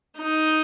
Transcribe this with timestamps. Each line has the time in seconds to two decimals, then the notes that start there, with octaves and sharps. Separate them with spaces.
0.18 D#4